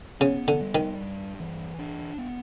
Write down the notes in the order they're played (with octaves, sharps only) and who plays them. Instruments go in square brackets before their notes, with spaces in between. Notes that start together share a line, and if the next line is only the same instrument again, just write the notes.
[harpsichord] C#3 [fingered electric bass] B3
[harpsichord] D3
[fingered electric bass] G3
[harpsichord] D#3
[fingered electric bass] G2
E3
D4
B3